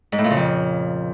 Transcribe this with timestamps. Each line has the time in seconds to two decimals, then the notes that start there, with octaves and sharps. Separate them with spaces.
0.12 G#2
0.18 A2
0.24 A#2
0.30 C#3
0.36 F2